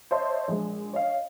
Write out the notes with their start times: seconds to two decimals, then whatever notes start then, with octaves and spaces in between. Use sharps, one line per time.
0.11 C5 C#5 D#5 E5 A5 C6
0.48 A#1 G#3
0.93 C#5 D#5 F5